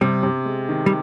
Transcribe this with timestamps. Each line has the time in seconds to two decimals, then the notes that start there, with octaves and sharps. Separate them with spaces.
0.01 C3 G3
0.23 C3
0.45 G#3
0.69 D#3
0.86 G3